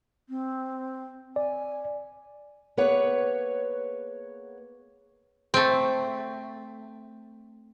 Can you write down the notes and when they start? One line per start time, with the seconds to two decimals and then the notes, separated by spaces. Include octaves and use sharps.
0.29 C4
1.36 D5 G#5
2.77 A#3 B3 G#4 B4 C#5 F#5
5.54 A3 C4